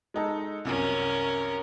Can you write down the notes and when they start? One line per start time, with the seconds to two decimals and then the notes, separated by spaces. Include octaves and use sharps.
0.14 G#3 D#4 A4
0.65 C2 F#2 C#4 A#4